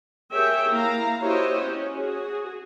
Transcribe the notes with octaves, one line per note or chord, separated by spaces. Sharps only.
G4 G#4 A#4 C#5 E5 G5
A#3 E4 F5 A#5
E4 F#4 G4 C5 C#5 D#5
C#4
F#4 G#4